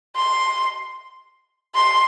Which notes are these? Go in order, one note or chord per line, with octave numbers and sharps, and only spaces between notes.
C6
C6